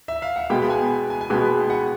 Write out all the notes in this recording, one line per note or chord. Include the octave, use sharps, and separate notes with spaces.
E5
F5
F#5
B2 G#3 B3 G5
G#5
G#5
G#5
B2 G#3 B3 G5
F#5